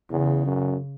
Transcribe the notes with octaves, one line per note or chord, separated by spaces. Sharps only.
E2 C#3
F#2